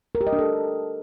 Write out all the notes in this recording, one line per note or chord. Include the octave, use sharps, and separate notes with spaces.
A#4
G4
D#5
D4
A4